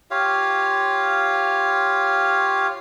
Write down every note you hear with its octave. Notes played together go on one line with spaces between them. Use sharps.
F4 G4 C#5 F5